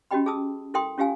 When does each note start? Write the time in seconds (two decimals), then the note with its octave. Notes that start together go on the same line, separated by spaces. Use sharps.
0.11 C#4 F#4 G4 D#5 G5 B5
0.26 G#4 A5 D#6 E6
0.74 E4 A4 A#4 G5 C6 D#6
0.98 C#4 F4 G4 F5 G#5